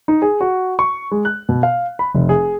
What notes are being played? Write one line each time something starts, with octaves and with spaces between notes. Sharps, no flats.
D#4
G#4
F#4
C#6
G#3
F#6
B2
F5
B5
F1
G#4